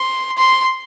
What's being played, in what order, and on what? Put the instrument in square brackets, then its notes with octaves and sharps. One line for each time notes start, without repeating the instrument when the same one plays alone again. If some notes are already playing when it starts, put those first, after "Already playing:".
Already playing: [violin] C6
C6